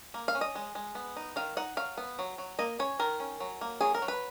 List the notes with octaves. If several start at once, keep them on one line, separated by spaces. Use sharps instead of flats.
A#3
F5
C#4
D#5
G#3
G#3
B3
D#4
D#3 F5
D#4 F#5
F#3 F5
B3
F#3
F#3
A#3 D#5
C#4 C#5
D#3 A#4
C#4
F#3
A#3
F#3 G#4
A#4
F#3
B4